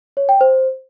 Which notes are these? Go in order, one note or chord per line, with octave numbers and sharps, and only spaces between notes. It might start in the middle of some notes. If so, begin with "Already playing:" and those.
C#5
G5
C5